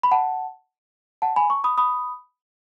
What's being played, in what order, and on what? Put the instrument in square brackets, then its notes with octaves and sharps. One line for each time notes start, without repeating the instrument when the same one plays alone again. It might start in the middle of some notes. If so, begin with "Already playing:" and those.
[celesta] B5
F#5 A5
F#5 A5
G#5 B5
A5 C#6
B5 D#6
B5 D#6